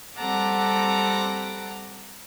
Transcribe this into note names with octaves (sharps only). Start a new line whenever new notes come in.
G3 C4 A4 F#5 A#5 D6